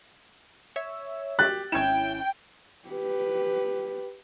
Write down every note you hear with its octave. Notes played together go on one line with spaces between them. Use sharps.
C#5 E5 E6
G4 F#6 A6
G#1 C#4 E4 G5 G#6 E7
G4 B4